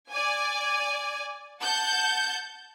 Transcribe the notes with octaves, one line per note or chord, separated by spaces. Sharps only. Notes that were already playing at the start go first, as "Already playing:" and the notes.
D5 G#5
F#5 A5 G6